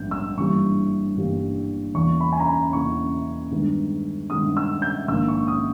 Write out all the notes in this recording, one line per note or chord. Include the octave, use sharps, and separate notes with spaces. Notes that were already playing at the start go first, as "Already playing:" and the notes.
Already playing: A#1 G#2 G3 B3 G6
E6
G1 G2 E3 G3 A#3 C#6
G1 G2 E3 G3 A#3
E2 C#3 E3 A#3 C#6
B5
G#5
A#5
B5
E2 C#3 E3 A#3 C#6
G2 D#3 G#3 B3
G2 D#3 G#3 B3 D#6
E6
G6
A#1 G#2 D#3 A#3 E6
C#6
D#6